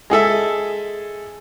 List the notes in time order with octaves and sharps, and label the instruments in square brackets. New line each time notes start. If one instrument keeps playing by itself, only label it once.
[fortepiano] G#3 G#4 A4 E5